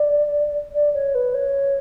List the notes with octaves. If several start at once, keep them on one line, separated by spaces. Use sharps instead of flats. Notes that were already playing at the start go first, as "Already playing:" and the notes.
Already playing: D5
D5
C#5
B4
C#5